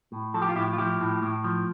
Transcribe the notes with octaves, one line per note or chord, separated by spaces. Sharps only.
A2
F3 A4
G4
F4
A2 E4 G4
F4
F3 E4 G4
A2
A2
F3